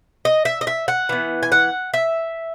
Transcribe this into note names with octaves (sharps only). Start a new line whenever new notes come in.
D#5
E5
D#5
E5
F#5
E3 B3
G#5
F#5
E5